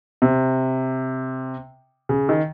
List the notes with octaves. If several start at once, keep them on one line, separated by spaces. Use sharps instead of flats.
C3
C#3
D#3